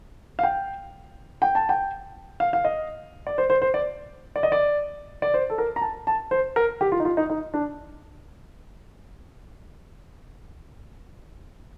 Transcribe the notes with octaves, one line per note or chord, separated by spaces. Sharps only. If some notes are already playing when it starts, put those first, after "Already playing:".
F5
G5
G5
A5
G5
F5
F5
D#5
D5
C5
C5
C5
D5
D5
D#5
D5
D5
C5
A4
A#4
A#5
A5
A5
C5
A#4
G4
F4
D#4
F4
D#4
D#4
D4